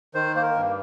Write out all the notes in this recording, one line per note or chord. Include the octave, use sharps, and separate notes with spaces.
D#3 C5
A#3 C5
A#4
G2